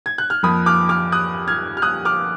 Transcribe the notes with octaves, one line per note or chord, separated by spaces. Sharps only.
G#6
F#6
F6
F2 F3 A#3 B5 D#6
D6 F6
D6 F6
D#6 F#6
F6 G#6
F6
D#6 F#6
D6 F6